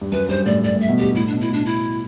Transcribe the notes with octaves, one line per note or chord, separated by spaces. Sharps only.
G2
F#2 B4
G2 C5
A2 D5
G2 D5
A2
E5
B2
G2 G4
A2 E4
D4
B2
E4
A2 D4
E4